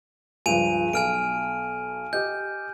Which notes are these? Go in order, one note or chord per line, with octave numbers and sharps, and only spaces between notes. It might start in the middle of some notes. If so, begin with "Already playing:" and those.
C#2 G2 F3 G#5 D#7 F7
B1 G#5 F6 D7
G4 D#5 G6